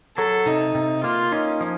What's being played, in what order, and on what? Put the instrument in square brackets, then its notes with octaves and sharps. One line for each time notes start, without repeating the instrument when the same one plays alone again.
[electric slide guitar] F#3 [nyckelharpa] A4
[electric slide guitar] C3 [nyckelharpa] D#4
[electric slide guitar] C3
[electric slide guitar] A#3 [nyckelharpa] F4
[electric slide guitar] C#4 [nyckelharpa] D#4
[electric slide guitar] F3